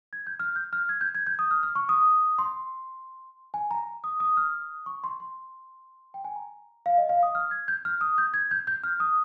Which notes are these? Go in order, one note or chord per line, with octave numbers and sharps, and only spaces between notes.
G#6
G6
F6
G6
F6
G#6
G6
G#6
G6
D#6
F6
F6
C#6
D#6
C6
G#5
A#5
D#6
D#6
F6
D#6
C#6
C6
C6
G5
G#5
A#5
F5
D#5
F5
D#6
F6
G#6
G6
F6
D#6
G6
G#6
G6
G6
F6
D#6